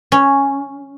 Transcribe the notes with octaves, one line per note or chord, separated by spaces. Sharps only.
C#4